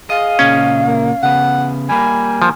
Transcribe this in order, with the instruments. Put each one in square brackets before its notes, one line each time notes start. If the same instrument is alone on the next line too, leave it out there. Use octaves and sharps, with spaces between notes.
[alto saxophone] G#4 [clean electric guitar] D#5 [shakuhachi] F5
[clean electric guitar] A#2 C#3 D#5 [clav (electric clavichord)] C#4
[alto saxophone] A#3
[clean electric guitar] C#3 B3 [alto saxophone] F#5
[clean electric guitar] G3 A#3 [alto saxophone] G#5 [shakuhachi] B5
[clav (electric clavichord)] F3